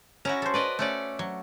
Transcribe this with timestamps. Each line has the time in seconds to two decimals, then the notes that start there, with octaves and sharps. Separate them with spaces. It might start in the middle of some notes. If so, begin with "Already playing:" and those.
0.25 C#4 E4 F#4 A#5
0.42 A4 C5
0.54 B4 D5 D#5
0.79 A3 C#4 D5
1.19 F#3